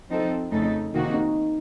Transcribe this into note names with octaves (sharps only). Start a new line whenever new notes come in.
F3 C4 D#4 A4
F2 C#3 A3 D#4 A4
C3 D#3 A#3 D#4 F#4
D#4